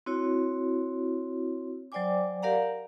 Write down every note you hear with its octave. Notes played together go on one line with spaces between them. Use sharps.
C4 E4 F#4 C#5
F#3 C5 D5 G5 G#5 D6
G4 A#4 D5 F5 F#5 A#5